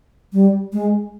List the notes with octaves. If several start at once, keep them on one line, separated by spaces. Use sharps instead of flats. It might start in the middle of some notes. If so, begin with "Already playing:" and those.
G3
G#3